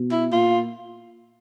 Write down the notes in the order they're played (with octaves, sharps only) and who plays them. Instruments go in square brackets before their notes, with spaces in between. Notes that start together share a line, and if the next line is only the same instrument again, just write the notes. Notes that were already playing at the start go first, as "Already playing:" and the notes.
Already playing: [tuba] B2
[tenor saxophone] E4
[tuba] A#2 [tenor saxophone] F4